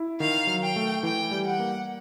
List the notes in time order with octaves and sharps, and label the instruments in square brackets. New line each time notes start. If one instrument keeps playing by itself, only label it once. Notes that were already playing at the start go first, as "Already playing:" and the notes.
Already playing: [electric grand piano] E4
[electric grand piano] D#3 [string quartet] F5
[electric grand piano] F#3
[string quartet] G5
[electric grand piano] A3
[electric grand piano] E3 [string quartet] G5
[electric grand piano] G3
[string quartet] F#5
[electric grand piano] A#3